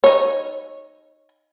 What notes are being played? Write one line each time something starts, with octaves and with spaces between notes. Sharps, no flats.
D#4 C#5